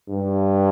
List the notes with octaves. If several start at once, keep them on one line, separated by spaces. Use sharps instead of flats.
G2